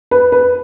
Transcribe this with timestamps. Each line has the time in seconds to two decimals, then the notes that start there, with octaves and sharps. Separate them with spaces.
0.11 B4
0.32 B4